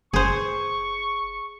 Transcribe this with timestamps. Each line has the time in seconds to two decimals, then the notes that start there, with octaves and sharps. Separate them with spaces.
0.13 F#1 G#4 C5 C#6